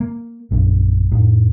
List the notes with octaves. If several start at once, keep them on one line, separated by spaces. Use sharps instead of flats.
A#3
A#1 F#2 D4
F2 A2